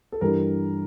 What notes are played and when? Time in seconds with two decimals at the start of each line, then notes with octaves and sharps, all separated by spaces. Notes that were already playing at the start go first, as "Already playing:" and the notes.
0.12 A4
0.21 G2 E3 G3 A#4